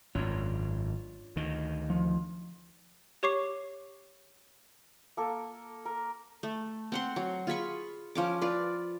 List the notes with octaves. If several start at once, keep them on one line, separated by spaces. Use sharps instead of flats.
G#1 F#2 D4 F4 C#5
D2 D#3
F3
G4 C#5 C#6 D6 C7
A#3 A4
A#4
A3
C4 F#5 C6
F#3
F4 G#4 B5 C#6
F3 C#4 D6
F4 B4 D5